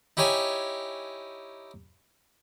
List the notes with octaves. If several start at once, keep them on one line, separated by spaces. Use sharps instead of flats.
D#4 E4 G4 C#5 G#5 C#6